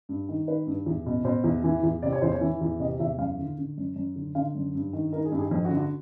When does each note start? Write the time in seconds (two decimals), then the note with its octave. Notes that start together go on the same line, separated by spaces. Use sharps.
0.09 G2
0.29 D#3
0.47 D#3 B4
0.67 G2
0.86 E2
1.06 B2
1.25 B2 C5
1.44 E2
1.64 E3
1.83 E2
2.02 C3 D5
2.13 C#5
2.22 E2 C5
2.32 C#5
2.41 E3
2.61 E2
2.80 C3 D#5
3.00 E2 E5
3.18 F#2 F5
3.39 D3
3.58 D3
3.78 F#2
3.96 F#2
4.16 D3
4.35 D3 F5
4.55 F#2
4.75 G2
4.93 D#3
5.13 D#3 A#4
5.25 G#4
5.32 G2 G4
5.38 G#4
5.51 F2
5.65 F#4
5.70 D3
5.77 F#4